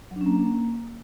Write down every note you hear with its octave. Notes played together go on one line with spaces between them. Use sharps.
F#3
D4
C#4
A#3